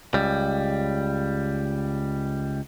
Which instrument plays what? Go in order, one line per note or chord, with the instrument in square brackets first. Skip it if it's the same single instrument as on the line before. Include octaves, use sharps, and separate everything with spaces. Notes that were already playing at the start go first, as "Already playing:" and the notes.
[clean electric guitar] C#2 G3